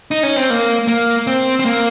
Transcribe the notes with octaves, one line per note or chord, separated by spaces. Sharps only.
D#4
C#4
C4
A#3
A#3
C4
C4
A#3